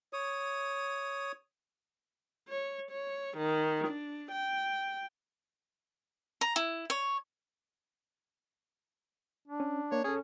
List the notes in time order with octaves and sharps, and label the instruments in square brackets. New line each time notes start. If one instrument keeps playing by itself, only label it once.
[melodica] C#5 D#6
[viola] C#5
C#5
D#3
D4
G5
[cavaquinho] A#5
E4
C#5
[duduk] D4
[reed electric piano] C#4
[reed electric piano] A#3 [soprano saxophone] C#5
[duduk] C#4 [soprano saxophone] G#4 [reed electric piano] A4 C#5